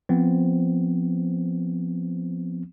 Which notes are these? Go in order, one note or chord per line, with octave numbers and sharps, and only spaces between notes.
F3 B3 C4